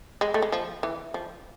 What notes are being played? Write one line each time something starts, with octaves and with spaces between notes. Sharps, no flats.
G#3
A3
G#3
F3
E3
F3